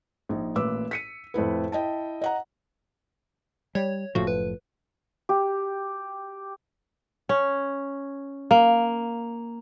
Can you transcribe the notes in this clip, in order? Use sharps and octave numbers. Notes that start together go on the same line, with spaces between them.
A#1 D#4
A1 A#2 B4 D6 E6
B6 C#7 D#7
F2 A2 E4 B4
E4 D#5 G5 A5
D#5 F#5 A#5
G3 C#5
F#1 A2 F3 F#4
B4
G4
C#4
A#3